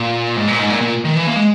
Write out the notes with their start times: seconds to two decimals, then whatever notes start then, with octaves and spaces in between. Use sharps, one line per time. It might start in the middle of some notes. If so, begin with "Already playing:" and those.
Already playing: A#2
0.37 G#2
0.48 A#2
0.59 G#2
0.70 A#2
0.81 A#2
1.04 D#3
1.16 E3
1.27 A#3
1.36 G#3